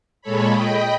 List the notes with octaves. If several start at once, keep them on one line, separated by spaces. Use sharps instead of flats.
A#2 G#3 A4 C#5 B5
D#5 G5 B5